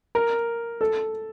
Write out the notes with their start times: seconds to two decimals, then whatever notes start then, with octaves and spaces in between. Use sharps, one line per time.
0.15 A#4
0.81 A4